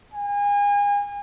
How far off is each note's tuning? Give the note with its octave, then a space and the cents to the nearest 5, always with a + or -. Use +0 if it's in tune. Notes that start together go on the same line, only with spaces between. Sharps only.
G#5 -35